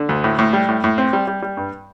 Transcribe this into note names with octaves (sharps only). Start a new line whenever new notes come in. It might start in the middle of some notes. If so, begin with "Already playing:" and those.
Already playing: D3
D2
A2
A2
G3
A2
A2
C4
G3
G3
G3
G2